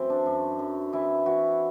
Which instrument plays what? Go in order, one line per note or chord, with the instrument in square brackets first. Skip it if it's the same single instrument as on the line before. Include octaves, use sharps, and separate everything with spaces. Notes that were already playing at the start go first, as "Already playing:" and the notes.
Already playing: [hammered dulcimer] F#2 E3 C4
D4
F#2
F#2
E3 E4
E3 F#4